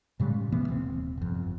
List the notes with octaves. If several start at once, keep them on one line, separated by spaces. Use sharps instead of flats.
A2 C#3 G3 G#3
C3 E3 A#3 B3
D#1 C3 C4
G1 F2